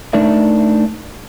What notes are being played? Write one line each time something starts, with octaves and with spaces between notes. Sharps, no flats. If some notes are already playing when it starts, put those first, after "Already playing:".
A3 D4 D#4 A#4 E5